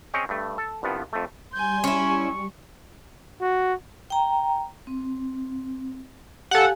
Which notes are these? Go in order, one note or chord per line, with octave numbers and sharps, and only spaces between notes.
C4 C#4 G#4 C#5 D#5 G5
G2 A3
A4
C2 G2 F3 B3
F2 A3
G3 G#5 C6 G6
C#4 E4 C#6
F#4
G5 A#5
C4
G4 A4 F5 F#5 G#5